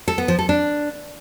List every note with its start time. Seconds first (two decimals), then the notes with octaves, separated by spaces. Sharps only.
0.08 A4
0.18 B3
0.28 F3
0.39 A4
0.49 D4